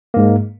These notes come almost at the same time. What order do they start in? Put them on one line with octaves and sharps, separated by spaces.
A#3 G#2 G#3